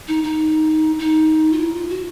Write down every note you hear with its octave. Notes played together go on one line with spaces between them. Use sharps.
D#4
D#4
D#4
F4
E4
F4
F#4